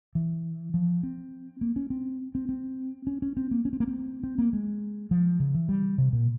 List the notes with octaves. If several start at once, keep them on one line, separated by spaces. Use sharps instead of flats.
E3
F3
C4
A#3
C#4
C4
C4
C4
C#4
C#4
C4
A#3
C#4
C4
A#3
C4
C4
A#3
G#3
F3
C#3
E3
G3
C3
A#2